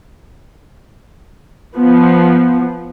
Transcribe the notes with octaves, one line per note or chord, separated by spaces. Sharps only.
F3 B3